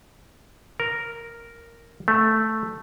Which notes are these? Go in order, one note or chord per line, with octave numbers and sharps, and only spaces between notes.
A#4
A3